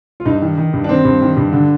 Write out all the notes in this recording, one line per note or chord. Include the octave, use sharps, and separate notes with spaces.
F4
G2 D#4
D#3
D#3
G2
D4
D#3 C4
G2
D#3
G2
D3